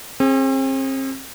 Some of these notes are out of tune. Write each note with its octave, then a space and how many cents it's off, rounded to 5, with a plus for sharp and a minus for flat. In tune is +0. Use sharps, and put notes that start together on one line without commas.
C4 +40 G#4 +0